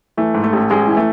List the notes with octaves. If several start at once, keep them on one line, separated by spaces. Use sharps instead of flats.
E3 A3
G#2
A3
A1
A1 G#3
E3
A3